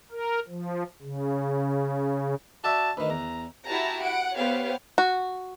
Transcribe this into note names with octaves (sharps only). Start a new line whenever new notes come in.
A#4
F3
C#3
F#4 D5 E5 A5
D2 D#3 B4
E2 A#5
E4 F#4 G4 A5 A#5
F#5 D7
B3 G4 C5 C#5 F5
F#4